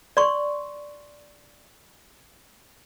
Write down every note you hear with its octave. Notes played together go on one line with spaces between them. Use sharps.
D5 C6 C#6